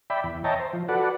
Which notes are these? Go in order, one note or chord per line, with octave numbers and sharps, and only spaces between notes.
D5 E5 G5 B5
E2
C#5 D#5 E5 G5 A5 A#5
C5
F3
F#4 A4 B4 D5 F#5